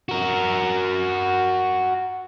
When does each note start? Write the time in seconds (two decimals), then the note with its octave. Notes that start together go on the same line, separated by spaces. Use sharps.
0.09 F#4 A#4